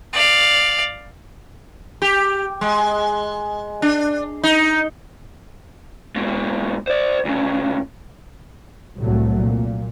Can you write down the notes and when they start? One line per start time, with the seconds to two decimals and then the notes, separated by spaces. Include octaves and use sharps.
0.13 D5 F5
2.02 G4
2.61 G#3
3.82 D4
4.43 D#4
6.16 G#2 B2
6.87 C5 D5
7.25 D2 C#3
9.00 C2 A2 F#3 A3
9.38 A#2